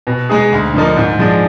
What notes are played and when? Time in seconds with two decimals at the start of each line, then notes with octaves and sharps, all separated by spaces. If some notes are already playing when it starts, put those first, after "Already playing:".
0.07 B2
0.29 G#3 D#4 G#4
0.52 D2
0.74 D3 F3 A#3 D#4
0.97 G#2
1.19 F3 G#3 D4